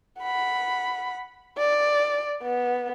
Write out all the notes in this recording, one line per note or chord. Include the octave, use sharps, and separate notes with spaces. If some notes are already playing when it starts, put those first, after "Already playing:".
F#5 B5
D5
B3